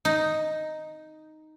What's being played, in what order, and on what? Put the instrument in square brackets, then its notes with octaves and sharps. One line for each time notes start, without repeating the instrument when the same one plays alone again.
[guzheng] D#4